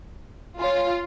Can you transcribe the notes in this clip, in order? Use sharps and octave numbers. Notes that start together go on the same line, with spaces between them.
F4 C#5 G#5